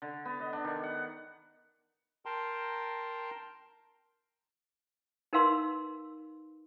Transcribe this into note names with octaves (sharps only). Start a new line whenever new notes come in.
D3
B3
D#5
D4
D#3
F#5
A#4 G5 A5 A#5 C6
D#4 A#4 B4 F5 C6 E6